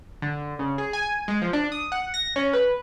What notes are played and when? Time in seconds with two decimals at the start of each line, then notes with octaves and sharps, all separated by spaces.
0.22 D3
0.59 C#3
0.78 G#4
0.93 G#5
1.28 G#3
1.42 F3
1.53 D4
1.72 D#6
1.92 F#5
2.14 A#6
2.36 C#4
2.53 B4